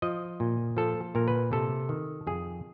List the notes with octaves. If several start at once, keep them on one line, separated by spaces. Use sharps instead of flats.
F3 D#5
A#2
F3 A4
A#2 A#4
B4
C3 A4
D#3
F2 G#4